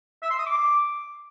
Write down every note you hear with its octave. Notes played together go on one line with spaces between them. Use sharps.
E5
C6
D#6
D6